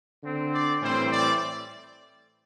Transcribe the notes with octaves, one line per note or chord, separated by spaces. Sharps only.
D3 C4
D5
A2 E3 G3 C4 C5
D5